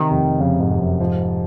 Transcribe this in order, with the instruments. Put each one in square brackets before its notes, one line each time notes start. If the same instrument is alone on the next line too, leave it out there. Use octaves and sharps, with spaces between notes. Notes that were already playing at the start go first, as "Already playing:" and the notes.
Already playing: [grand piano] C3 [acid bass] D#3
[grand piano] F1
[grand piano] F2 [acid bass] C#3
[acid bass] G#2
[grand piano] F1
[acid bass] F#2
[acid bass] G#2 [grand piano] F3